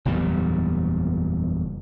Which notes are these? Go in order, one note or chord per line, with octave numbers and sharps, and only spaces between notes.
F#1 E2 A#2 G3